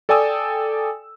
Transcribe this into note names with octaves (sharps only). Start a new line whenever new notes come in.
A4 D5 G5 G#5 D#6 E6